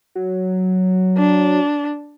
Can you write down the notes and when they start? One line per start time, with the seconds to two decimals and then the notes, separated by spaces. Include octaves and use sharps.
0.15 F#3
1.17 D4